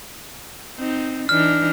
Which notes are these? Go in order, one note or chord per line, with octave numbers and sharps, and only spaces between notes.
C4 D#4
E3 D4 D#4 F6